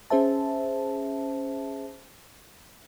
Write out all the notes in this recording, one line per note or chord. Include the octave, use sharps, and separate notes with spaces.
C#4 G#4 C5 E5 A5